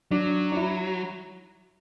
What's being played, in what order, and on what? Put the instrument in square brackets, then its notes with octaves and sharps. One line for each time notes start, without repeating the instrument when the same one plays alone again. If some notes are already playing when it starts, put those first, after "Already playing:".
[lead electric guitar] F#3 [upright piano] D4
[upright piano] D4
E4